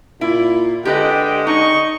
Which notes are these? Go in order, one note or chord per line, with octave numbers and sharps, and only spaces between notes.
A#2 E4
D3 G#3 G4 B4 D#5 G5
D#4 D#5 C#6